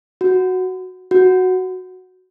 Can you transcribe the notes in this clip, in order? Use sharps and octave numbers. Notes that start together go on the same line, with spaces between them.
F#4
F#4